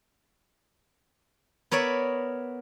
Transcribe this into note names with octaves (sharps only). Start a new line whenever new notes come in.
B3 A#4 C#5 D5 E5